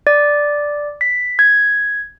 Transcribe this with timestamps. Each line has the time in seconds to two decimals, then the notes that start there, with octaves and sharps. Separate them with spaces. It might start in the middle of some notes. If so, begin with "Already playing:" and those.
0.07 D5
1.01 B6
1.39 G#6